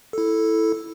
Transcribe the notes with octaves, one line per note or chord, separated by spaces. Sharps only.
E4 A4